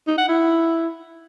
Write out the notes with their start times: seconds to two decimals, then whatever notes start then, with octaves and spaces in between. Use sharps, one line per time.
0.07 D#4
0.18 F#5
0.28 E4